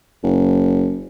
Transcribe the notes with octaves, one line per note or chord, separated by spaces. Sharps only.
F#1